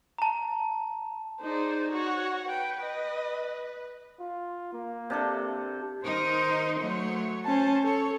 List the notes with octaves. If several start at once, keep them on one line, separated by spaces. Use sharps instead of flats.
A5 A#5
D#4 G#4 C5 D5
F#4 C#5 F#5
B4 G5
D#5
F4
A#3
C3 D4 A4
D#3 D#4 A#4 C5
F#3 A3 C#5
C#4 C5 A5
A4 C#5